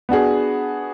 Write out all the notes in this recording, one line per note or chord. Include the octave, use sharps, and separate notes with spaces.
B3 D4 F#4 G#4